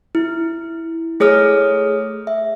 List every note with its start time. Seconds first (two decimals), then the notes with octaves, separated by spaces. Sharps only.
0.15 E4
1.20 A3 G#4 C#5 D#6 F6
2.27 E5